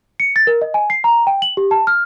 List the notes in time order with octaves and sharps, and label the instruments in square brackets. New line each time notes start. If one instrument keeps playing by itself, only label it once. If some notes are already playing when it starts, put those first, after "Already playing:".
[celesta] C#7
A6
A#4
D#5
G#5
C7
A#5
G5
F#7
G4
A5
F6